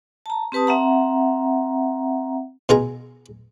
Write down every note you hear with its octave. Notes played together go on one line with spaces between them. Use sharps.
A5 A#5
C4 G4 B4 A5 D#6
C4 E5 F#5 A#5
B2 F4 G#4 A#5